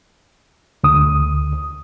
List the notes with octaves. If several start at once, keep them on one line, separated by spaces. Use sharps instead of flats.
D2 D#6